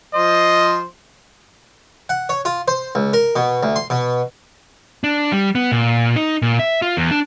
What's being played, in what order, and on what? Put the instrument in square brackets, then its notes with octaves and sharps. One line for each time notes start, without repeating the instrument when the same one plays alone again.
[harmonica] F3 C5 [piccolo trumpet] D#5
[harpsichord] F#5
C#5
F4
C5
C#2
A#4
B2
D2
C6
B2
[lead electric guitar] D4
G3
B3
A#2
D#4
A#2
E5
F4
E2
D4